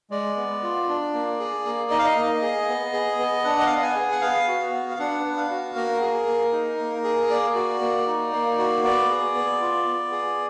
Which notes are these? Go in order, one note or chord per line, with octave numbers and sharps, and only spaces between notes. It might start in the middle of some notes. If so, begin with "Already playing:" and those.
G#3 D5
B3
F4
D4
A#3
G#4
A#3
D#4 D#5
F5
D#5
A#3
G#4
B3
G#4
B3
D4 F#5
D#5
F5
B3
F#5
G#5
G#4
F#5
B3 F5
F#4
B3
F5
D4 F#5
B3
F5
F#4
A#3 A#4
G#4
A#3
D#4
A#3
G#4
A#3 D5
F#4
A#3
D#4
A#3
F#4
B3 D5
G#4
B3
F4
B3
G#4